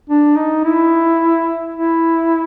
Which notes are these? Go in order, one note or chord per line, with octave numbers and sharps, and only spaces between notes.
D4
D#4
E4
E4